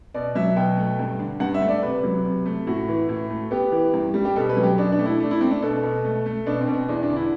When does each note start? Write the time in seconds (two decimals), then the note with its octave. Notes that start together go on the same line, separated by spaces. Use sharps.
0.14 B2 D5
0.35 F#3 E5
0.56 B2 G5
0.77 A3
0.99 G2
1.19 D3
1.40 G2 F#5
1.54 E5
1.61 A3
1.69 D5
1.83 C3 B4
2.03 F#3
2.24 C3
2.46 A3
2.67 A2 F#4
2.88 E3
3.09 A2
3.30 A3
3.51 B3 G4
3.72 E3
3.94 G2
4.14 G3
4.25 G4
4.36 B2 A4
4.49 B4
4.57 F#3
4.63 G4
4.78 B2 D4
4.92 D4
4.99 A3
5.05 E4
5.20 A3 D4
5.31 E4
5.40 A3 C4
5.51 D4
5.62 B2 A4
5.83 B2
6.04 A3
6.26 A3
6.46 B2 D4
6.60 C4
6.67 B2
6.74 C4
6.88 E2 D4
7.03 D4
7.10 D3
7.16 E4